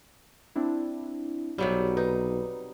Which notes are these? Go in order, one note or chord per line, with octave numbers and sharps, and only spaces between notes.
C4 D4 E4
B1 C3 F#3 G3
D#4 B4